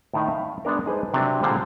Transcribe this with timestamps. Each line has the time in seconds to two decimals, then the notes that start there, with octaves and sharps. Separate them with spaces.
0.14 A2 D#3 D#4 A#5
0.28 E5 F5
0.65 G#3 B3 D4 A#4
0.86 D#4 G#4 B4 C5 A5
1.14 C3 F#3 C4 D4
1.42 A#2 D3 G3 G#3 C5